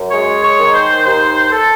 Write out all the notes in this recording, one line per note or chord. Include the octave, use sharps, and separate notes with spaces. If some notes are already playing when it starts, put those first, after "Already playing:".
Already playing: F#2
G#3 C#5
C#5
D#3
C5
D#2 C5
A4